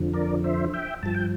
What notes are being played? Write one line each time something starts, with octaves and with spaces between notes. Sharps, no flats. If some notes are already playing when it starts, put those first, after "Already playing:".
Already playing: F2 D3 F3
A#4 D5
C5 E5
E5 G5
G2 F3 A5
G5